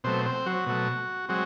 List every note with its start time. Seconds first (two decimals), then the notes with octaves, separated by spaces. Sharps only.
0.04 B2 F#3 A3 C4 C5
0.25 C4 C5
0.46 F#3 F#4
0.66 B2 F#3 A3
1.29 F#3 G#3 C4 F#4